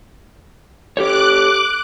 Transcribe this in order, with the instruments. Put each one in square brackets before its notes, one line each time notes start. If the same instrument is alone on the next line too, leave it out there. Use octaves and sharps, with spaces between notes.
[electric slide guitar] G4 A4 C#5 [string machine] D6 F#6